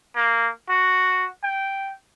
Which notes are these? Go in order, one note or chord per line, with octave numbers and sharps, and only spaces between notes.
A#3
F#4
G5